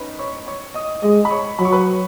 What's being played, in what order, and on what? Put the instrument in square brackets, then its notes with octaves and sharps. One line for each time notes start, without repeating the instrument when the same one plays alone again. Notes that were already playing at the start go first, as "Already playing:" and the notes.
Already playing: [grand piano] C#4 D#4 B4 D#5 B5
C#5 C#6
C#5 C#6
D#5 D#6
[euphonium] G#3 [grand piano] D#5 D#6
[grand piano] B5
C#5 C#6
[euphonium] F#3 [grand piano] B5
[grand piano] C#6
B4 B5